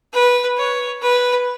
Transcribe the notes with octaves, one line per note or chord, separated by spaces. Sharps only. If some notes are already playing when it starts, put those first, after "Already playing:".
B4
C#5
B4